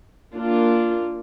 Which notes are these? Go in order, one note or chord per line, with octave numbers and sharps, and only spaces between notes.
A#3 D4 F4